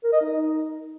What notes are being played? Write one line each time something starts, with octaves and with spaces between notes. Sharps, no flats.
A#4
D#5
D#4